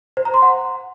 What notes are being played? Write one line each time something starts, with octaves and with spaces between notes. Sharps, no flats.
C5
A#5
C6
F#5